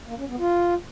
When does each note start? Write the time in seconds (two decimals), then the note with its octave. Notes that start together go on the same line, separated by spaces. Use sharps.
0.07 A#3
0.17 C#4
0.28 B3
0.39 F4